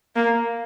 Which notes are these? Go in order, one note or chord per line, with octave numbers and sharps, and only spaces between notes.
A#3